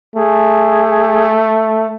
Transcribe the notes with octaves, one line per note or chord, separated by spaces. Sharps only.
A3 G#4